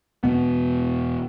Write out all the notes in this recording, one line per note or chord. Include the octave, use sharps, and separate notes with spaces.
E1 G#2 B2 B3